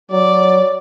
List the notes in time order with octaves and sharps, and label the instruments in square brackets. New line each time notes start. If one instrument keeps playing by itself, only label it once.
[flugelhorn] F#3 [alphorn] C#5 [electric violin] D5